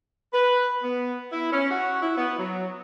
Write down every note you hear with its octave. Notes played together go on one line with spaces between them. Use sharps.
B4
B3
E4
C#4
F#4
E4
B3
F#3